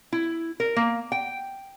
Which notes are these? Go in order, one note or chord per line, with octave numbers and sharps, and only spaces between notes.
E4
A#4
A#3
G5